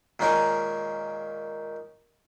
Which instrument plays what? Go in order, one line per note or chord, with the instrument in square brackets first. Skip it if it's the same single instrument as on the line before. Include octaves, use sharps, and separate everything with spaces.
[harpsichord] A#2 D#3 G#3 C#4 D#4 A#4